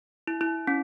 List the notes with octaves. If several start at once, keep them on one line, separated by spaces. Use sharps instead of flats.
E4
E4
C#4